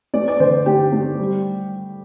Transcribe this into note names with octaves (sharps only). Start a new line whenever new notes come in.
A3 D5
D5
D3 C5
A3 G4
A3
G3